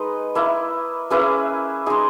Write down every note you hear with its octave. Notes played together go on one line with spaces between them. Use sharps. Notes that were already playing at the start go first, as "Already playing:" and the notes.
Already playing: G#3 D#4 B4 D#5
A#3 E4
A#3 C#4 E4 G#4 B4
G#3 D#4 G#4